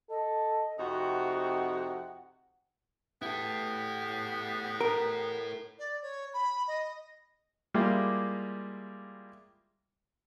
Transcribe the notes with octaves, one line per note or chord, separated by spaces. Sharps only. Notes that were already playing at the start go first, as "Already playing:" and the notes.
A4 D#5
F2 C3 D#4 F#4 F#5
E2 B3 E4 G4 A4
A#4
D5
C#5
B5
D#5
G3 G#3 A#3 E4 F4 G4